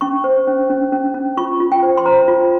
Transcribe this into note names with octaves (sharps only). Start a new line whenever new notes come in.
C#4 C#6
C5
C#4
C#4
C#4
C#4
F4 C#6
F4
G5
C5
C6
C5 A#5
F4